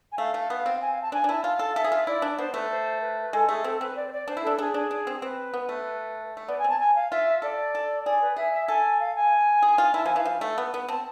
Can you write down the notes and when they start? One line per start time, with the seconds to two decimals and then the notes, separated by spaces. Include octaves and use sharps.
0.12 G#5
0.18 A3 F5
0.34 A3
0.50 B3
0.66 C4
0.81 G#5
0.92 F5
1.02 A5
1.12 D4 G#5
1.24 D4
1.28 E4 A5
1.44 F4 F5
1.59 A4
1.76 A4 E5
1.84 G#4
1.92 F4
2.07 E4 D5
2.22 D4
2.38 B3 C5
2.54 A3 B4
2.70 C5
3.01 B4
3.21 B4
3.33 G#3 A4
3.49 A3 G#4
3.64 C4 A4
3.80 C4 B4
3.96 D5
4.07 C5
4.12 D5
4.28 D4 C5
4.37 E4
4.43 D4 A4
4.58 D4 G#4
4.74 D4
4.91 D4
5.07 C4
5.22 C4 B4
5.54 B3
5.69 A3
6.37 A3
6.48 B3 D5
6.58 G#5
6.64 C4 A5
6.79 G#5
6.95 F5
7.11 F4 E5
7.42 A4 D5
7.75 A4
8.06 G#4 D5
8.22 B4
8.36 G#4 E5
8.53 E5
8.68 A4 G#5
9.00 F5
9.16 G#5
9.62 G#4
9.78 F4
9.94 E4 A5
10.05 F3 G#5
10.16 E3 F5
10.25 F3
10.41 A3
10.58 B3
10.74 B3
10.89 C4 A5